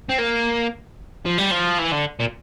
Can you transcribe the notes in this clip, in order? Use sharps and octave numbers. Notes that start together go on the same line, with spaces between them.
C4
A#3
F3
G3
F3
E3
D3
A#2